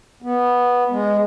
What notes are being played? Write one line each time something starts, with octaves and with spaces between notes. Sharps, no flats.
B3
G#3